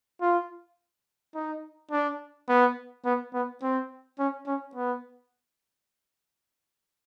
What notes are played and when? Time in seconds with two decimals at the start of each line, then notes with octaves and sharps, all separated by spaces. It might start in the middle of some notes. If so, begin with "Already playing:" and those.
0.21 F4
1.35 D#4
1.91 D4
2.48 B3
3.05 B3
3.34 B3
3.62 C4
4.19 C#4
4.46 C#4
4.75 B3